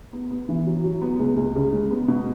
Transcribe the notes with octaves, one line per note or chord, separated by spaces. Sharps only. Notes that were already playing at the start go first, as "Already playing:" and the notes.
B3
B3
E3
F#3
F#3
B3
C#2
C#2
C#3
G#3
B3
B2